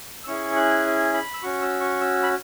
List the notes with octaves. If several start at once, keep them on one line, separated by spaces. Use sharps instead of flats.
E6
C#4 E4 G#4 C#6
F#6
B5
E6
C#4 F#4 C#6
E6
C#6
E6
B5